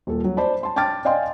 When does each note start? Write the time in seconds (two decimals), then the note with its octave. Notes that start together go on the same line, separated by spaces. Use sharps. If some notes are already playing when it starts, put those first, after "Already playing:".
0.07 D#1 A4
0.24 F#3
0.37 C5 D5 A5 B5
0.63 A5 C6
0.76 G5 A5 D6 F6 A6
1.05 D5 D#5 F5 G5 G#5 C6